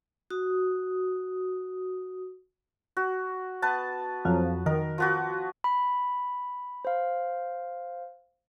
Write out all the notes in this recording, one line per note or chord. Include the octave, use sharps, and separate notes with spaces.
F#4 D#6
F#4
B3 B4 A5
F2 F3 F#3
D#3 A#4
F3 B3 F#4
B5
C5 F5